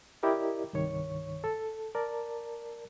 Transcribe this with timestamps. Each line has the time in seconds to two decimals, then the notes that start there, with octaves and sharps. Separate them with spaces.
0.23 E4 G4 A#4 D5 D#5
0.73 C2 G2 D#3 C#5 C#6
1.44 A4
1.95 A#4 D5 A5